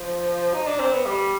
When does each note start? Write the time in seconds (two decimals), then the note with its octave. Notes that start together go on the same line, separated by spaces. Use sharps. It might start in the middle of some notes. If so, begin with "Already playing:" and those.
Already playing: F3
0.54 D#4
0.67 D4
0.80 C4
0.93 B3
1.06 G3